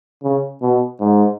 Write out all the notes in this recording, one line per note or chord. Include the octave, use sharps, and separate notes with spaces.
C#3
B2
G#2